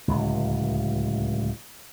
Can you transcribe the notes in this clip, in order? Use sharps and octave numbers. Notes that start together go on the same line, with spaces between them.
D1 C#2